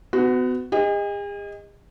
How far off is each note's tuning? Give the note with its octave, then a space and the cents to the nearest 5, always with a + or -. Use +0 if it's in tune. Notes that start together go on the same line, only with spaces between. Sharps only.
B3 +35 F#4 +0 F#5 +0
G#4 -45 D#5 +0